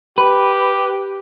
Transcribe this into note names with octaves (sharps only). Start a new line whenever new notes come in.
G4 B4